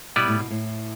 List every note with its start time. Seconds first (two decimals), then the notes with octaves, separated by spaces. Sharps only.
0.16 B2 G3 B3 E4 B4 D5
0.28 A2
0.39 B2
0.50 A2